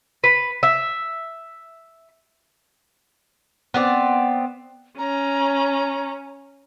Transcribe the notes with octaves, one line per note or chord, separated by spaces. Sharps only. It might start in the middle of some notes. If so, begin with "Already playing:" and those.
B4
E5
B3 C4 D5
C#4 A#5